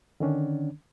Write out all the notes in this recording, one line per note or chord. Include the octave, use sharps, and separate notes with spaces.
D3 D#3 C#4 D4